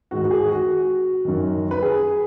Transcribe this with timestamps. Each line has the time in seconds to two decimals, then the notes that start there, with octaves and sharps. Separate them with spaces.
0.11 G#2 D#3 F#4
0.24 F#4
0.31 G#4
0.49 F#4
1.25 F#2 D#3
1.71 B4
1.82 G#4